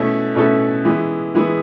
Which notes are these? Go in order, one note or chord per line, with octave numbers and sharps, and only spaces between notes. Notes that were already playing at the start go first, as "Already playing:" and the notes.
Already playing: B2 A3 C#4 E4 A4
B2 A3 C#4 E4 A4
E3 G#3 B3 E4
E3 G#3 B3 E4